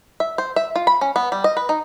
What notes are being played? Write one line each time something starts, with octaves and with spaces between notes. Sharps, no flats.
E5
C5
E5
F4
B5
C#4
B3
G3
D#5
B4
D#4